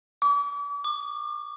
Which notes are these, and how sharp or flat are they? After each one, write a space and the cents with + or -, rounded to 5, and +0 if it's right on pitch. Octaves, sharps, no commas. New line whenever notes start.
D6 -45
D6 +40